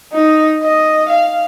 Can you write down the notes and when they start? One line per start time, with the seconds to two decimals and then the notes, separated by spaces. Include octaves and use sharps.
0.12 D#4
0.63 D#5
1.09 F5